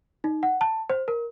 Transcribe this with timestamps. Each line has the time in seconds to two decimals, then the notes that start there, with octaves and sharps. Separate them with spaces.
0.24 D#4
0.43 F#5
0.61 A5
0.90 C5
1.08 A#4